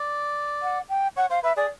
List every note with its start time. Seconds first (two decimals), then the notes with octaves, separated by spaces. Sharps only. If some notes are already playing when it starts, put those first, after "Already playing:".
Already playing: D5
0.63 F#5
0.89 G5
1.17 C#5 F#5
1.30 C5 F5
1.43 B4 E5
1.57 G#4 D5